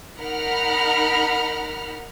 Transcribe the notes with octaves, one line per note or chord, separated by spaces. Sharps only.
D#4 A#4 F#5 A#5 B5 F6